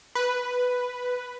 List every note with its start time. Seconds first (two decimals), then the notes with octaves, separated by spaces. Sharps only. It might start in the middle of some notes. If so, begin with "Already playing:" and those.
0.15 B4